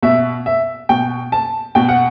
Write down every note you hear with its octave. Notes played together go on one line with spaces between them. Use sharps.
B2 E5
E5
B2 G5
A5
B2 G5
F#5